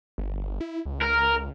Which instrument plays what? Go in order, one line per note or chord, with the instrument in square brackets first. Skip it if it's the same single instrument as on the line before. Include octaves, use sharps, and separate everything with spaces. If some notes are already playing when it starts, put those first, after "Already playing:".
[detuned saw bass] G1
E4
C#2
[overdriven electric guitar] A#4